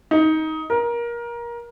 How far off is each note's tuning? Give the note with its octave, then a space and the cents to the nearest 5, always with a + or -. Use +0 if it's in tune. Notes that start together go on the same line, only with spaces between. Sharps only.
D#4 +15
A#4 +20